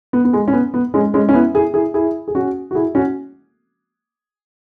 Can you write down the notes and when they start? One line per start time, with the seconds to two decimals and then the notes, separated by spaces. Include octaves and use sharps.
0.13 B3
0.25 B3
0.33 G#3
0.48 C#4
0.53 B3
0.74 B3
0.94 G#3 C#4
1.14 G#3 C#4
1.29 C#4
1.34 B3 E4
1.54 E4 G#4
1.74 E4 G#4
1.94 E4 G#4
2.28 G#4
2.35 C#4 F#4
2.71 F#4
2.75 E4 G#4
2.95 C#4 F#4